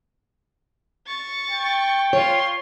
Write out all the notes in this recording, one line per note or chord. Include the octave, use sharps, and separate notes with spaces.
C#6 A6
G5
F4 C#5 C6